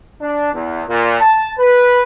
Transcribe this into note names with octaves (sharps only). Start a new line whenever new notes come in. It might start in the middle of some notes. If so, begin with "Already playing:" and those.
D4
E2
A#2
A5
B4